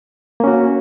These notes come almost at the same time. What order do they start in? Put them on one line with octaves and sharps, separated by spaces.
A#3 C#4 F#4